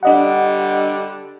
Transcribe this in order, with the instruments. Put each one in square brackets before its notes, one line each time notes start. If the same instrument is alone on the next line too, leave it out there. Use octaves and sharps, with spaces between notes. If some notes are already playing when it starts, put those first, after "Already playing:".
[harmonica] D3 G3 [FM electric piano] D4 D#5 F#5